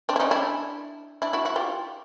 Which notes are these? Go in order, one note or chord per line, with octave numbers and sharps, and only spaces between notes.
C4 D4
E4
C#4 D#4
D4 E4
D4 E4
E4 F#4
E4 F#4
F4 G4